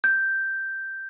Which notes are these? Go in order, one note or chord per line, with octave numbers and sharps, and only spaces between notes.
G6